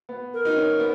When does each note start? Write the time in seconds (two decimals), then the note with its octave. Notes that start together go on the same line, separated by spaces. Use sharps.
0.09 B3
0.33 A#4
0.45 D#4
0.56 C#4
0.80 B3